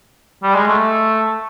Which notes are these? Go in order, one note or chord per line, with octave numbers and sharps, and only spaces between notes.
G3
G#3
A3